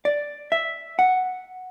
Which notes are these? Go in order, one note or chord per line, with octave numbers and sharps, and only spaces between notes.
D5
E5
F#5